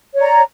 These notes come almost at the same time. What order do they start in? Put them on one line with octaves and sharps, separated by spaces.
C#5 D5 A#5